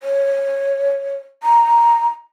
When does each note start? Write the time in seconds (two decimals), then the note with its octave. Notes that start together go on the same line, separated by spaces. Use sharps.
0.01 C#5
1.43 A#5